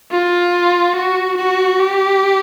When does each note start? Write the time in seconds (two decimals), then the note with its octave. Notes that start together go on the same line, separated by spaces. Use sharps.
0.12 F4
0.96 F#4
1.37 F#4
1.79 G4